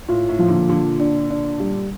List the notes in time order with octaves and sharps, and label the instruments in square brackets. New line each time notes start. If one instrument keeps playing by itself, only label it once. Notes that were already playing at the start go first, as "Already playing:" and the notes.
[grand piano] A2 [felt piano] F4
[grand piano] A2
[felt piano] F3
[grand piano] A#2 D3
[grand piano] A#2 D3 [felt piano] F4
[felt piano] D4
D4
G3